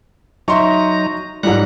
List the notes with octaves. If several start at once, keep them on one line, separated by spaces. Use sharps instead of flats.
F#3 D#4 E5 A#5 C6 C#6
G#2 F#3 G3 F#5 A#5 F#6